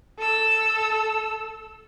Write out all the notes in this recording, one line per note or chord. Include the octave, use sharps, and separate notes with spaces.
A4 E6